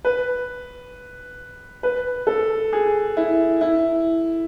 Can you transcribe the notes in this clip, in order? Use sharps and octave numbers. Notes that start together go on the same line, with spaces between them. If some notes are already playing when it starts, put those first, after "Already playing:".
B4
B4
A4
G#4
E4
E4